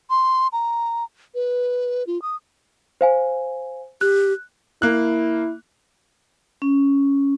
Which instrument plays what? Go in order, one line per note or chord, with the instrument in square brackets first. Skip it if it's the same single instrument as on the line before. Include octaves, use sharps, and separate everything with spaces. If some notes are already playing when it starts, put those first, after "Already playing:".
[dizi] C6
A#5
B4
F4
D#6
[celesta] C5 F5 G#5
[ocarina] G4 [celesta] F#6
[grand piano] A#3 F#6 [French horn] E4
[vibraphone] C#4